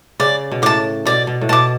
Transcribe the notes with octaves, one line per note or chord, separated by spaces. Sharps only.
C#3 D5
B2
A2 A5 D6
B2 D5
B2
A2
B2 A5 D6